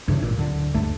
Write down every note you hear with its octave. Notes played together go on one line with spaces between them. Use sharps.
G2 C#3 E3
G#1 A#2
D1 D3
D2 G2 A3